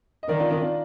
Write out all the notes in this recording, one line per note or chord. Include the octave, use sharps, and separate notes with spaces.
D#5
D#3 A#4 D5
D4 F4
D4 F4
D4 F4